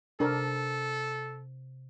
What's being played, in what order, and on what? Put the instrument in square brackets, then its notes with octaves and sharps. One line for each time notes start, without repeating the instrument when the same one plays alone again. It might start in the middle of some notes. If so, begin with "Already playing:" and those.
[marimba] C3 [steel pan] D4 A#4 [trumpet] A4